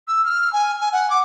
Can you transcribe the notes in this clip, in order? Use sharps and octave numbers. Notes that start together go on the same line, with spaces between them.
E6
F6
G#5
G#5
F#5
D6